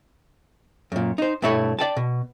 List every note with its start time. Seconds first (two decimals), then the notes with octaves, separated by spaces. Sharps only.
0.92 F#2 A#2
1.18 D#4 C5
1.42 G2 B2 A3 E4 C#5 B5
1.79 D5 G5 A5
1.97 B2